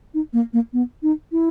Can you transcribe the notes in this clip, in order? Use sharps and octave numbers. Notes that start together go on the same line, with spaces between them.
D#4
A#3
A#3
B3
D#4
E4